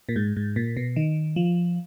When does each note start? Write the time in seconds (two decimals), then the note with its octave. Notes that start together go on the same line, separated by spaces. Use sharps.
0.09 A#2
0.16 G#2
0.37 G#2
0.56 A#2
0.77 B2
0.96 D#3
1.36 F3